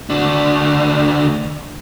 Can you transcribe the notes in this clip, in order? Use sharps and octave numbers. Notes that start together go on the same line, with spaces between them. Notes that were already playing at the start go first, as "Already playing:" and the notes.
D2 D4